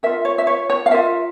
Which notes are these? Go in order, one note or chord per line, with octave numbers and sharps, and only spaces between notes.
F4 A#4 E5
C#5
E5
C#5
C#5
F5
F4 A#4 E5